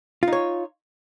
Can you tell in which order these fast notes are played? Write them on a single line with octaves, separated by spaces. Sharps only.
F4 D#4 C#5